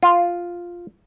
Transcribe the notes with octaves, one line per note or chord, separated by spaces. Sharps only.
F4